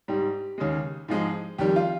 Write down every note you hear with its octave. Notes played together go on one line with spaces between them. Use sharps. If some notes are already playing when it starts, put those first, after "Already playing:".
G#2 G3 G4
D#2 C#3 G#3
G#2 F3 G#3
F2 D#3 G3 G4
F4